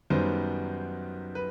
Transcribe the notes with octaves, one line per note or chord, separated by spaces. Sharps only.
F#2 D#3 G3 B3 C5
B4